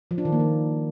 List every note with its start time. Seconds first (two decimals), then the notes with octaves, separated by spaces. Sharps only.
0.11 F3
0.18 D4
0.25 D#3
0.32 A#3
0.40 D#3